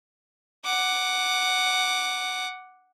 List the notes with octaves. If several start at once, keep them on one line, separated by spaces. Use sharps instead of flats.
F#5 D6